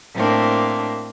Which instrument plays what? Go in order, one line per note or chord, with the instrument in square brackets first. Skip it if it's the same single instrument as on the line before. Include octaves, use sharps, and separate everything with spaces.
[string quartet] A2 A#3 C4 D4